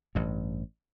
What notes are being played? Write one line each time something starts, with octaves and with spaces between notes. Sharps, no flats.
A1 G2